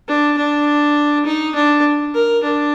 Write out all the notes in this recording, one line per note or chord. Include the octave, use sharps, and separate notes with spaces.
D4
D4
D#4
D4
A#4
D4